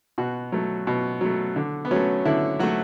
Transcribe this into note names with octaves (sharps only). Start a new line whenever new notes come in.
B2 F#4
F#3 A3
B2
F#3 A3
D3
B3
F#3 A3 C#4
D3 E4
F#3 A3 F#4